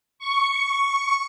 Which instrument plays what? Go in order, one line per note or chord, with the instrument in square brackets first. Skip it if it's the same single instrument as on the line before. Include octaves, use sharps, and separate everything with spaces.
[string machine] C#6